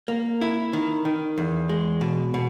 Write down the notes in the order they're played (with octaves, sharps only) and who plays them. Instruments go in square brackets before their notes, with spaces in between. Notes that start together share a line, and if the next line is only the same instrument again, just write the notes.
[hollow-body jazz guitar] A#3
E4
D#3
D#3
E2
G#3
B2
B2